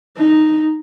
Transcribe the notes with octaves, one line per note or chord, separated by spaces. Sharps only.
D#4